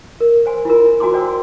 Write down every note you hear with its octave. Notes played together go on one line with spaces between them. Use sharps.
A#4
C5 G#5 C6
E4 F4 A#4
F#4 G#5 A#5 C6 D6
C5 D5 G5 A#5 E6